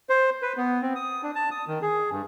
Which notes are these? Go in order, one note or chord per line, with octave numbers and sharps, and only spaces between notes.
C5
B4
B3
C4
D#6
D4
A5
D#6
D#3
G#4
G2